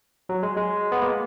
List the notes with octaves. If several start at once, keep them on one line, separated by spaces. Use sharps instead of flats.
F#3
G#3
G#3
B3
A#3